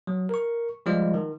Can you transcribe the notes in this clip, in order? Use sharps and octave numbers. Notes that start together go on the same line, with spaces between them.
F#3
A#4 C#6
F3 G3 G#3 F4 D5 D#5
D#3